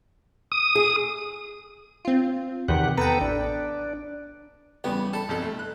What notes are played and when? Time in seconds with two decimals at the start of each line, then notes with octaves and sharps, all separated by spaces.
0.52 D#6
0.75 G#4
2.05 C4 F4
2.68 E2 C3 D#3 G4 F#5
2.98 B3 A4 B4 G5 A#5
3.21 A1 D4
4.84 E2 C#3 G3 B3 G4
5.13 A4 A5 B5
5.29 B1 F2 A4
5.42 A3
5.59 F#6